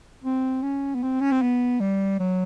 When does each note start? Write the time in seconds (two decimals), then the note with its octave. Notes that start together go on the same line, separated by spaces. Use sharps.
0.24 C4
0.62 C#4
0.94 B3
1.03 C4
1.20 C#4
1.31 C4
1.42 B3
1.80 G3
2.19 F#3